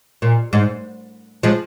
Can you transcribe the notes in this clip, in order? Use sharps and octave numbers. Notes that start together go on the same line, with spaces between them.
A#2
G#2
F3 G#3